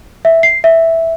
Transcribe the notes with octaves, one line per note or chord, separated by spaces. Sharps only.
E5
C7
E5